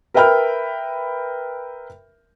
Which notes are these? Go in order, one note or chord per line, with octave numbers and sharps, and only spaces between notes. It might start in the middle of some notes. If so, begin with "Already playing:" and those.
A#4 B4 E5 G5 B5 F6